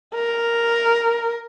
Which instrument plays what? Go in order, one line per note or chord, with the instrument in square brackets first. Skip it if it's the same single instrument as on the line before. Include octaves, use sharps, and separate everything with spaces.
[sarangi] A#4